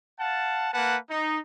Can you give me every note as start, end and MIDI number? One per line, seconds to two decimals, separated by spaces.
0.20 0.69 77
0.20 0.69 78
0.20 0.69 81
0.74 0.97 58
0.74 0.97 71
0.74 0.97 78
0.74 0.97 81
1.09 1.39 63